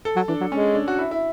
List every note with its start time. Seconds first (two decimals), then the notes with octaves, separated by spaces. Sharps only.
0.05 A4
0.16 F#3
0.28 E3 D4
0.41 F#3
0.51 G#3 C#4
0.75 D4
0.88 F#4
0.99 E4
1.11 E4